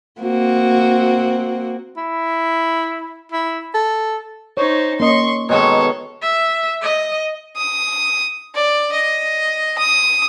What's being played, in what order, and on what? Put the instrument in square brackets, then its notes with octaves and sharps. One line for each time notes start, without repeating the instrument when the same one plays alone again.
[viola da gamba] A#3 C4 F#4
[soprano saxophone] E4
E4
A4
[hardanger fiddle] D#4 C5 [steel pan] C#5
[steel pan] A#3 C#4 D#5 [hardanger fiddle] C6 C#6
[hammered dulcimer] B2 D#3 G#3 [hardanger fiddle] A4 C#5
[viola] E5
D#5
[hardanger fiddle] D#6
D5
D#5
D#6